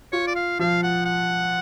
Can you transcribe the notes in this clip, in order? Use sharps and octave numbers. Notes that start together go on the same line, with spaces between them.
F4 C#5
D5
F5
F3 F5
F#5
F#5